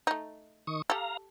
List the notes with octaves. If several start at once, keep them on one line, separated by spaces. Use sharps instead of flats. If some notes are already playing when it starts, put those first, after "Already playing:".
A3 D#4
D#3 C#6 D#6
G4 A4 F5 A#5